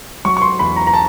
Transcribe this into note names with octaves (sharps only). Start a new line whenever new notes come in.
F#3 C#6
C#6
C6
E2 B5
A#5
A#5
A5